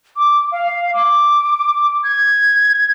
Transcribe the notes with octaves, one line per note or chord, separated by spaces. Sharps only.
D6
F5
D6
G#6